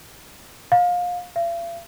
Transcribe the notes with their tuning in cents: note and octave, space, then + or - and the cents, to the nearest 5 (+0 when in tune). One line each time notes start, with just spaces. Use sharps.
F5 +25
F5 -45